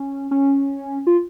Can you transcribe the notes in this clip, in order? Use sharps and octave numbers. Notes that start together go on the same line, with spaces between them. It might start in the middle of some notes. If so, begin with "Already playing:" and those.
Already playing: C#4
C#4
F4